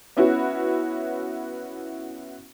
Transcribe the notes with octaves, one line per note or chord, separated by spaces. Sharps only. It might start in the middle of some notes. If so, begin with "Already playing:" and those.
B3 C#4 E4 F#4 B4